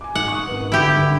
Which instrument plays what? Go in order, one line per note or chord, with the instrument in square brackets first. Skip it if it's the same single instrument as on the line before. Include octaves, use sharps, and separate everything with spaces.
[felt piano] G#5 D6
[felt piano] G#2 [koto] F#5
[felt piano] C#6 D#6
G#1 B4
[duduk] D3 [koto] E4 G4
[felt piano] G2